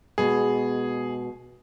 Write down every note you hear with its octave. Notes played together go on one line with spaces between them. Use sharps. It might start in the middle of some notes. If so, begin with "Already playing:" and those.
B2 G#3 G#4